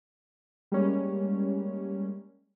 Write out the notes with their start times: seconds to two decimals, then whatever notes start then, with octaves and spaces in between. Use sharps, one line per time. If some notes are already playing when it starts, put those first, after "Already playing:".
0.72 G3 G#3 A#3 C#4